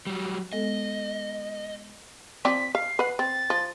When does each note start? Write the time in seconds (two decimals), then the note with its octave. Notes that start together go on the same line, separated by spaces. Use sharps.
0.07 F#3 G3
0.53 G#3 B3 A4 D#5
2.45 F3 C4 D5 B6
2.75 F5 C7
2.99 B4 F#5
3.19 C4 A6
3.50 F3